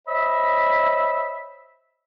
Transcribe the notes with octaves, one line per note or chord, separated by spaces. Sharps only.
C5 C#5 D#5 E5 B5